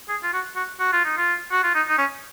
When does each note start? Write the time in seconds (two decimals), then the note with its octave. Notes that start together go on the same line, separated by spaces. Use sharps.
0.09 G#4
0.23 F4
0.33 F#4
0.56 F#4
0.80 F#4
0.93 F4
1.05 D#4
1.17 F4
1.52 F#4
1.63 F4
1.75 D#4
1.89 D#4
1.98 C#4